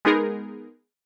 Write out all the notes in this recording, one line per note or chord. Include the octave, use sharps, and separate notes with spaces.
G#3 B3 D#4 G#4 A#4